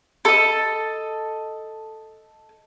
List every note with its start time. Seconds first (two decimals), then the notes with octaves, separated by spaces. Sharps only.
0.25 A4 D#5